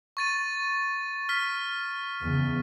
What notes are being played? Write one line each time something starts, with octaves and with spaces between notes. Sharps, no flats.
C#6 A6 D#7
F6 B6
E2 C#3